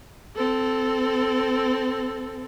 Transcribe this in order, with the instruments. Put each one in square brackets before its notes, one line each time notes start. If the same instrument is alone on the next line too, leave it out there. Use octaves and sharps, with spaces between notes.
[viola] C4 A4